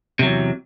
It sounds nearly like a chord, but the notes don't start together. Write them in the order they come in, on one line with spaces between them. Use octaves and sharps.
C3 F#3 E2